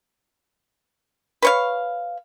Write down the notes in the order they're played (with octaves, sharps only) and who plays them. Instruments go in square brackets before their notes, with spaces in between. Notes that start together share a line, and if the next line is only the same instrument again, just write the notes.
[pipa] B4 C#5 F5